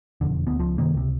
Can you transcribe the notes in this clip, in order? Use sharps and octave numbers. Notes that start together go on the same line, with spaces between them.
E1 B1 F2 D3
D2 B3
C#2 F3
F#2 C3 D#3 A#3
C#2 C3